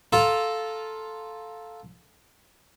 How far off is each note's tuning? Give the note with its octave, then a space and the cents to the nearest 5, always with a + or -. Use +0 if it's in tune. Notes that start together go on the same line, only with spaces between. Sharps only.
F4 +5 A4 -5 A#5 +0